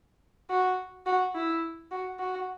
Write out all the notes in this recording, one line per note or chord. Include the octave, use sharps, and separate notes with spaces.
F#4
F#4
E4
F#4
F#4